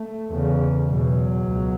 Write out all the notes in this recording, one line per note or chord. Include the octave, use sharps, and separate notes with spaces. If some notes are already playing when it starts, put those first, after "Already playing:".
Already playing: A3
E2 C#3
E2 B2 F#3
C#2 B2